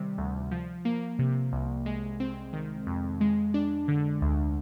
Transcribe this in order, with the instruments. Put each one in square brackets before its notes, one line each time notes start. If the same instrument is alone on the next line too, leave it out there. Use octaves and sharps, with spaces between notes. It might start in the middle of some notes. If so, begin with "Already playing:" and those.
Already playing: [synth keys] C3 D#3 G3
D2
F3
A#3
C3
C2
G#3
C4
D#3
F2
G#3
D4
D3
D2